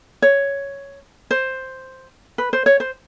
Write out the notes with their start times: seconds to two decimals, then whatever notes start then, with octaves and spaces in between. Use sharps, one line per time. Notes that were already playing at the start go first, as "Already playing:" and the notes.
0.22 C#5
1.31 C5
2.38 B4
2.53 C5
2.66 C#5
2.80 C5